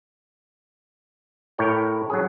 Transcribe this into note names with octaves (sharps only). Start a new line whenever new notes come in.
A2 E4 A#4 C#5 G5
F#3 C#4 G#4